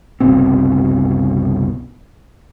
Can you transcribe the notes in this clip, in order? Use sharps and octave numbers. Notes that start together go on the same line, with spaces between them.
F#1 C2 B2 C4